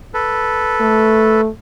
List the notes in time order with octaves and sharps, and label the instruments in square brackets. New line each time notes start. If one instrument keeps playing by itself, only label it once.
[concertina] A4 B4
[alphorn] A3